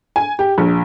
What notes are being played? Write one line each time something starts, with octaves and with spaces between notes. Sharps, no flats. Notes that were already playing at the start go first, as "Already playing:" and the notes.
G#5
G4
A#1